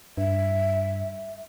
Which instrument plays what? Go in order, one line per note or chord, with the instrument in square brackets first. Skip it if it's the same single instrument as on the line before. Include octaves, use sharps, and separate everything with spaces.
[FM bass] G2 [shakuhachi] E5